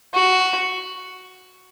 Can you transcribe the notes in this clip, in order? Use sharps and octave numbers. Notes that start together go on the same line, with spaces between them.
F#4